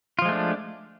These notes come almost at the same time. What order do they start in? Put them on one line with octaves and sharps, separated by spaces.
F4 F3 G#3 A3 D4